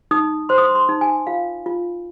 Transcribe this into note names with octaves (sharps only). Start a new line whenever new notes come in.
D#4 D#6
C5 C6
D#6
C6
C6
D#4
G#5
F4 F5
F4